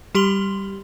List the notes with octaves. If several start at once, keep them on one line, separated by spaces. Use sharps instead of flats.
G3 G4 C6 F#7 G7